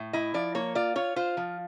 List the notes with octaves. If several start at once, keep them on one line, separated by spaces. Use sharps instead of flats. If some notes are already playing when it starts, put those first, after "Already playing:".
Already playing: A2
E4 D#5
F3 D5
A#3 C#5
F4 D5
F4 C#5
F4 C5
F3